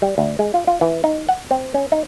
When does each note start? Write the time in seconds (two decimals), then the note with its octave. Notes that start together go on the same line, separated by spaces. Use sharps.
0.02 G3
0.18 D2
0.39 G#3
0.54 F4
0.67 F4
0.81 E3
1.04 D#4
1.29 F#5
1.51 C4
1.74 C#4
1.92 D#4